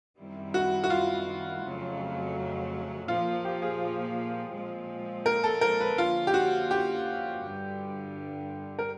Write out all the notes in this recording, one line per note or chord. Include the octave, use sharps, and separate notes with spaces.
F#2 D#3 G3 C4 E4
F#4
F#4
F4
F2 C#3 F#3 A3
A#2 F3 A#3 F4
G4
G#4
A#2 F3 G#3 C4
A#4
A4
A#4
B4
D3 F3 A#3 C#4 F4
G4
F#4
G4
G2 D3 G3
A#4